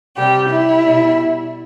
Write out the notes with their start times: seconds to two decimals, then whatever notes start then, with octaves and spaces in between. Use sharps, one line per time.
0.17 C3 G3 G4
0.50 E4
0.84 B2 G3